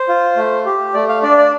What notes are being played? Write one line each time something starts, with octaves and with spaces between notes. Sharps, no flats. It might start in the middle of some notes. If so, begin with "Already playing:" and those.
Already playing: C5
F4
A3
G4
A3 D5
F5
D4 D5
D5